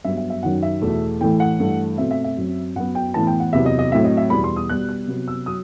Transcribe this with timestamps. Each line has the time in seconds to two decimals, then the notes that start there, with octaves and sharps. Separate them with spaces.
0.04 G2 F#3 B3 E5
0.17 E5
0.30 E5
0.43 F#2 D#3 F#3 F#5
0.63 E5
0.82 E2 B2 A3
1.21 A2 E3 A3 G5
1.40 F#5
1.60 G2 E3 A3
1.98 B2 A3 C4 E5
2.11 E5
2.24 E5
2.37 F#2 F#3 C4
2.76 F#2 F#3 B3 F#5
2.95 G5
3.14 A2 E3 B3 A5
3.27 G5
3.40 F#5
3.53 E2 C3 F#3 B3 E5
3.66 D#5
3.79 D#5
3.92 A2 F#3 C4 E5
4.05 D#5
4.17 E5
4.30 E2 B2 G3 B3 B5
4.44 C6
4.56 D#6
4.69 B2 G3 B3 F#6
4.89 F#6
5.07 C3 F#3 B3
5.28 E6
5.46 F#3 D#6